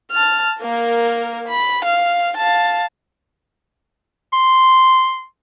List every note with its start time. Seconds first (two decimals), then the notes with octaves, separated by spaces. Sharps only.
0.12 A5 F6
0.60 A#3 A#4
1.48 B5
1.85 F5
2.37 F5 A5
4.33 C6